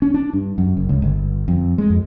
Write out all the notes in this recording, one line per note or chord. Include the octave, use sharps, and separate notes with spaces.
C#4
D4
G2
F#2
F#1
C#2
G1
F2
G#3
F2